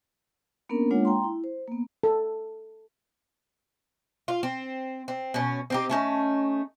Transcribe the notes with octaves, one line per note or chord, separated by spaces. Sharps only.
A#3 B3 C#4 D4 A#4
G#3 A#3 D4 F4 C#5 F#5
G5 A#5 C6
E4
C5
A#3 B3
A4
F4
C4
C4
B2 C#4
C4 D#4 G4
A3 C#4 D#4